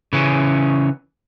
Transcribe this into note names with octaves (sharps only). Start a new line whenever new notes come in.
C#3 E3 C#4